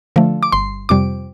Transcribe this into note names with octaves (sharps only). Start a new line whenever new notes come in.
D3 F3 A3
D6
G1 C6
F2 C3 G3 D6